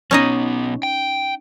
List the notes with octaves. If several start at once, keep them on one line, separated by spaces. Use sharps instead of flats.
B1 B3 C#4 D#4 D#5
G5